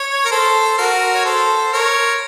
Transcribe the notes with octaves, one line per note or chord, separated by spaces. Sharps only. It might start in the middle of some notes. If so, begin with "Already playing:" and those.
Already playing: C#5
A#4
A4 C5
F#4 A#4
C#5
A4 C5
A#4 C#5